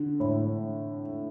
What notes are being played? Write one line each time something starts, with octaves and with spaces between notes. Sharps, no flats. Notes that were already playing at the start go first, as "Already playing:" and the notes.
Already playing: D3
A2